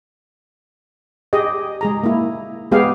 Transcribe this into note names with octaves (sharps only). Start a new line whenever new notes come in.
G4 G#4 D#5
G#3 G#4 A#5
A#3 E4
G#3 B3 G4 G#4 F5